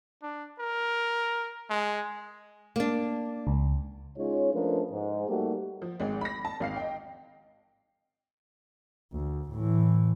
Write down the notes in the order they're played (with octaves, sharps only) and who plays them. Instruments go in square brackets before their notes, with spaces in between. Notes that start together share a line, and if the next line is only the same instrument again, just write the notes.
[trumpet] D4
A#4
G#3
[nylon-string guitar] A#3 D4
[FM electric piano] C#2
[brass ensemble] G#3 C#4 D#4 F4 C#5
F3 A3 C#4 D4 A#4 B4
G#2
G3 A3 A#3 D#4 F#4 G4
[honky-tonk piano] F3
G#1 G#3
B5 A#6
A5
G#1 F5 C7
D#5 G5
[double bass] D2
A2 E3